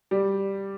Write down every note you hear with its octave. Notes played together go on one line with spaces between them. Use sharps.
G3